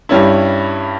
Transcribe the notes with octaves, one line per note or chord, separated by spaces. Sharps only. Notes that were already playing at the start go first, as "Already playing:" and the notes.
G2 G3 C#4 E4